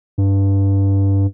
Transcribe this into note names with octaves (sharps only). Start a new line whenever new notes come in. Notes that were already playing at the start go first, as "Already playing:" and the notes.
G2